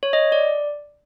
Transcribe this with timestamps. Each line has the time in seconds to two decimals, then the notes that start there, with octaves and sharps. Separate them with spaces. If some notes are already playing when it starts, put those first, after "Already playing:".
0.03 C#5
0.13 D#5
0.32 D5